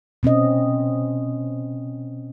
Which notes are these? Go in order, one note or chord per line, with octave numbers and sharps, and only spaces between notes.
B2 C4 C#4 D#5